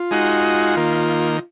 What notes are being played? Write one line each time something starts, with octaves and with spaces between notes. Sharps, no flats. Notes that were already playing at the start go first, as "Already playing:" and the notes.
Already playing: F4
G#3 D#4 F#4
D#3 A#3